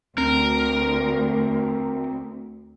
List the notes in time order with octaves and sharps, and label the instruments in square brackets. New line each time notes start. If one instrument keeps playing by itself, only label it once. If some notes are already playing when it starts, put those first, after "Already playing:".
[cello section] D2 [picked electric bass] C4 [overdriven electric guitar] A#4